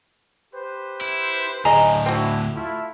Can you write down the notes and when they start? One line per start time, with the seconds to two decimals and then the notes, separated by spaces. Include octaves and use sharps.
0.54 G4 B4 C5
1.01 E4
1.65 D2 A2 G#4 D#5 A#5
2.06 C4 D4 E4 F#4
2.54 A3 E4 F4